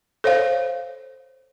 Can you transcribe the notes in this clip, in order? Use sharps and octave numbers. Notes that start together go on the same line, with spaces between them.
A4 C5 C#5 F5